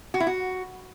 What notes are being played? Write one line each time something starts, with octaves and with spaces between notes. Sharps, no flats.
F#4
E4
F#4